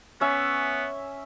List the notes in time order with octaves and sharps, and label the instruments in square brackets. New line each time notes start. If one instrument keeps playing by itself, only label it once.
[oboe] B3 [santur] C#4 E5